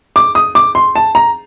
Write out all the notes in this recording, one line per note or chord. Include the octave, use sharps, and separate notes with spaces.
D6
D#6
D6
C6
A5
A#5